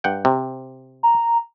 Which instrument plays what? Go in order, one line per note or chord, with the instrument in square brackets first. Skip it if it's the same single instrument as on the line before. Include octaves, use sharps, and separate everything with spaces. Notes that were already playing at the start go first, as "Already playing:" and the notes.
[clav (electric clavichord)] G2 F#5 G5
C3
[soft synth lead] A#5